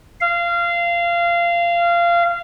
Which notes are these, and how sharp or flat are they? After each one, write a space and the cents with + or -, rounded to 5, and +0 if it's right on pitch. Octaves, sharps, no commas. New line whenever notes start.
F5 -20